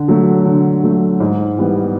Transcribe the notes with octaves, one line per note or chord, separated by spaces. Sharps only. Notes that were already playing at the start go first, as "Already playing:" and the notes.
Already playing: D3
F#3 A3
D3
F#3 A3
G#2
E3 G3 B3